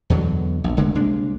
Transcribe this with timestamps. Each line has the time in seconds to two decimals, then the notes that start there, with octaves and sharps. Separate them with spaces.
0.10 E2 B2 D3 F#3
0.64 A#1
0.77 F1 D3 G#3 A3
0.95 C2 G#3 A#3 D4